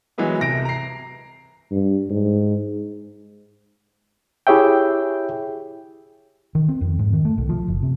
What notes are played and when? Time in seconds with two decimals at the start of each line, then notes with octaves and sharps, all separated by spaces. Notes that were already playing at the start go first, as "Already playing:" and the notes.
0.18 E3 F#3 G#3 B3 E4
0.39 C2 C3 A#6 D7
0.65 A#5 C7
1.71 G2
2.09 G#2
4.47 E4 G4 G#4 C#5 E5 G5
6.55 D#3
6.68 C4
6.81 F2
6.99 G#2
7.13 D#3
7.25 A3
7.38 B1
7.49 F3
7.68 F#1
7.82 C3